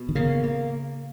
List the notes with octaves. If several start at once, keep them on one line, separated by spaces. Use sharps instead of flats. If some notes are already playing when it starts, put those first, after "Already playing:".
Already playing: B2
D#3
C#3 A#3
A#3